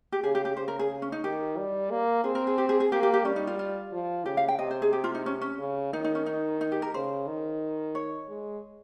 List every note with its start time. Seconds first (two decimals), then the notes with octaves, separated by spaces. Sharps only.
0.12 G4
0.23 C#3 G#4
0.35 G4
0.45 G4
0.57 C#3 C5
0.68 A#4
0.79 G#4
1.02 C#4
1.12 D#4
1.24 D#3 G4
1.58 G3
1.91 A#3
2.24 C4 G#4
2.35 A#4
2.47 G#4
2.58 G4
2.69 G#4
2.80 G#4
2.92 A#3 G4
3.03 G4
3.14 G4
3.25 G3 C#4
3.36 D#4
3.47 F4
3.59 F4
3.92 F3
4.25 C#3 G4
4.37 F5
4.48 G5
4.59 C3 D#5
4.71 C5
4.82 G#4
4.93 G4
5.04 F4
5.15 D#4
5.26 C#4
5.41 C#4
5.59 C#3
5.93 D#3 D#4
6.04 D#4
6.15 C#4
6.26 D#4
6.61 D#4
6.72 G4
6.82 A#4
6.94 C#3 C5
7.27 D#3
7.95 C#5
8.28 G#3